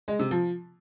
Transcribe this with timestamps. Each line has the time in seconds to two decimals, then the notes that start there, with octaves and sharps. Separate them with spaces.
0.08 G#3
0.19 C3
0.31 F3